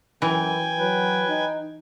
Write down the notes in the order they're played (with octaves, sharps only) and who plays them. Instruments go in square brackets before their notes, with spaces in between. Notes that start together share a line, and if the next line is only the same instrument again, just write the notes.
[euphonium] F#2 [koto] E3 [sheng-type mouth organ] G5 G#5
[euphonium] F#3 [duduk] B4
[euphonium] D#4